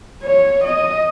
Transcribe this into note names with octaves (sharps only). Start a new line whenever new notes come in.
C#5
D#5